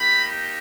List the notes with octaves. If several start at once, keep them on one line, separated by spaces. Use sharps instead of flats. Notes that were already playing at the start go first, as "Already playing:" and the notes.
Already playing: A#3 D#4 G4 B5